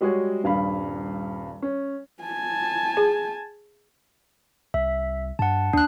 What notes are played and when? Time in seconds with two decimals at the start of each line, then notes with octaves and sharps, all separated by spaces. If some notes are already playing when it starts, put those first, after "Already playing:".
0.01 G3 G#3 F#4 G#4 C#5
0.44 D#1 G2 F5 B5
1.62 C#4
2.23 G#5 A5
2.97 G#4
4.74 C2 E5
5.39 G2 F#5 A5
5.73 D#2 D4 F#6